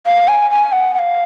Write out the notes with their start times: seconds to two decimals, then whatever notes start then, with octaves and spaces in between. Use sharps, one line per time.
0.06 F5
0.28 G#5
0.51 G#5
0.72 F#5
0.94 F#5
0.99 F5